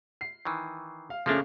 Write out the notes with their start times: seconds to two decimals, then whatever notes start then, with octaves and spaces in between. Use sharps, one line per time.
0.21 C7
0.45 D#3 E3
1.10 F5
1.26 C#3 F3 A3 A#3 C#4 D4